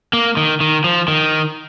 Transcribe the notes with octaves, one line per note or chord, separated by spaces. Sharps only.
A#3
D#3
D#3
F3
D#3